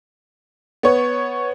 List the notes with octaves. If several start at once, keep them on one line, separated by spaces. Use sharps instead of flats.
B3 C#5